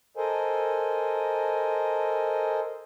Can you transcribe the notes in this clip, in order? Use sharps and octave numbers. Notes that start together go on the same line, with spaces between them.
A4 A#4 C5 D#5 G#5